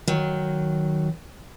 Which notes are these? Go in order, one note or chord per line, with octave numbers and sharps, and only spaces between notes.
D#3 F#3